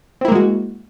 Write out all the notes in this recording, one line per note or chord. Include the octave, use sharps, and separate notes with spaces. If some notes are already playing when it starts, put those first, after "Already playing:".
G#3 A#3 C4 E4 F#4